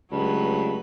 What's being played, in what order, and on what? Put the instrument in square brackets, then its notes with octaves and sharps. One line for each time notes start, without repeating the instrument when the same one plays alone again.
[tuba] C#2 [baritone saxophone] G2 [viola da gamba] F#3 A3 B4